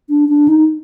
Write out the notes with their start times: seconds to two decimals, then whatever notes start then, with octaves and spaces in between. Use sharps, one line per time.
0.10 D4
0.29 D4
0.48 D#4